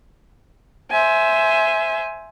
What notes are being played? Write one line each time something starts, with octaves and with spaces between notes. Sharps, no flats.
C5 E5 G#5